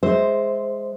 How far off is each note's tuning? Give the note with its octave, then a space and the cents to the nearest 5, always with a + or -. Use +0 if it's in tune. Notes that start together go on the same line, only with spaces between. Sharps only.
G#3 +0 C5 +0 E5 -15